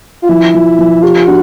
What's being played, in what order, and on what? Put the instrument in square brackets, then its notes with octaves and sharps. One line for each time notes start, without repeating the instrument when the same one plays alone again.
[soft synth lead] F4
[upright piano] F3 [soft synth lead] E4
[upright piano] F3
F3
[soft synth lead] F4 [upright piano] G4
[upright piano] D4 [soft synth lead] F#4